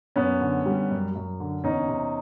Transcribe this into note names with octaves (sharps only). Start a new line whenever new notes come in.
F#2 B3 C#4
D3
G3
F#2
F#2
D3
E2 C#4 D#4
C3